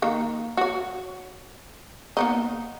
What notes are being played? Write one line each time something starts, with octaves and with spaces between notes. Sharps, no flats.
D#3 A#3
F#4 C#5
A#3 B3 D#4